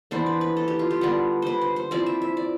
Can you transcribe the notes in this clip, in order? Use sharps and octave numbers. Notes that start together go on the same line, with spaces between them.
E3 B3 D4 C5
B4
B4
A4
G4
F4
G4
D3 G3 B3 D4
B4 C5
C5
C5
F3 C4 E4 D5
E5
E5
D5